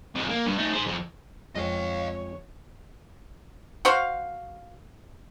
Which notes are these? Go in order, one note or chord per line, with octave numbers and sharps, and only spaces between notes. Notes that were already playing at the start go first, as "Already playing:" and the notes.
F2 G#3
A#3
G2
A3 D#4
G#4 C5
F2
F2 G#3 C4 C#5 D#5 F5
F#4 C5 F5